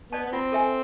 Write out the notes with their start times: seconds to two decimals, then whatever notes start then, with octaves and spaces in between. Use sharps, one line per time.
0.12 B3 D5 A5
0.26 B3
0.32 C4 F4
0.52 A4 E5 G#5